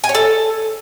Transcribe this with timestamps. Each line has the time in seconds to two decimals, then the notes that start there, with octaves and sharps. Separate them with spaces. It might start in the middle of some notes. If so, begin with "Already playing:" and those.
0.04 G#5
0.09 C#5
0.15 A4